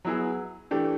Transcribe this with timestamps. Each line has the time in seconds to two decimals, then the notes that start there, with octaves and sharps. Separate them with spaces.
0.05 F#3 B3 E4 G#4
0.71 E3 A3 D4 G4